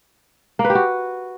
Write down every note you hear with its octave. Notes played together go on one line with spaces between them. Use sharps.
A#3
B4
G4
F#4